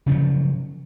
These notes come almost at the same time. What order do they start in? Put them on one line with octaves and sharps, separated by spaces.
C#3 F3 F#3